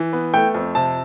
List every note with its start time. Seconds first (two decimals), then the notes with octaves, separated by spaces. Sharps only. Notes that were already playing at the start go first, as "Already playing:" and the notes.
Already playing: E3
0.13 B3
0.34 A3 G5
0.55 F2
0.75 C3 A5